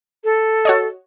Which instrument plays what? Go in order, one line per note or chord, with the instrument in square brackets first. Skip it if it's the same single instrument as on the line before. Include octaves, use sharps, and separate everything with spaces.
[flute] A4
[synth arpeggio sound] F#4 C#5 D#5